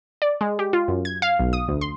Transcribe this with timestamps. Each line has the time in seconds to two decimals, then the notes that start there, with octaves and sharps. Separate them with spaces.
0.22 D5
0.41 G#3
0.59 G4
0.73 F4
0.88 F#2
1.05 G#6
1.22 F5
1.39 B1
1.53 D#6
1.68 D2
1.81 C6